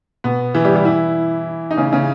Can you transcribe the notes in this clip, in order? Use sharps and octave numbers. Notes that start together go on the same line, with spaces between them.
B2 B3
E3 E4
G3 G4
G3 G4
E3 E4
D#4
C#3 C#4
C#3 C#4